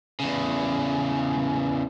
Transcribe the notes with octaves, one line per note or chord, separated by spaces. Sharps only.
E2 C#3